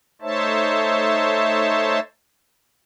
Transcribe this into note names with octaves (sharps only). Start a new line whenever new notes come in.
A3 D#4 C5 C#5 E5 A5